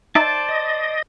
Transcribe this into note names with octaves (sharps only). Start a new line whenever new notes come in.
D#4 C5 D5 E5 A5
D#5